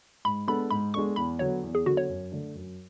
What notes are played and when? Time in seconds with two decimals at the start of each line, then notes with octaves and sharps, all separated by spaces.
0.25 G#2 B5
0.48 G#3 B3 D4 A4 B5
0.71 G#2 B5
0.94 G#3 B3 D4 A4 C#6
1.16 E2 B5
1.39 D3 F#3 B3 C#5
1.63 E2
1.75 G#4
1.86 D3 F#3 B3 F#4
1.97 C#5
2.09 F#2
2.32 D3 A3 D4
2.55 F#2